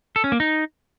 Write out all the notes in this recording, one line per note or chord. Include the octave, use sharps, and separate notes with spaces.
A4
C#4
A#3
D#4